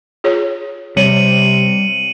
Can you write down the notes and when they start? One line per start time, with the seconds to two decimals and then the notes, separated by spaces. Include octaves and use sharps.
0.24 F4 G#4 C#5
0.97 C3 G3 C#5 C#7 D#7 F#7